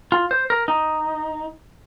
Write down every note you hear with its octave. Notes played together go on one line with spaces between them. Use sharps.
F4
C5
A#4
D#4